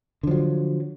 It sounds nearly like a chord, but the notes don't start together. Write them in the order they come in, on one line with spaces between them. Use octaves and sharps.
D3 F3 F#3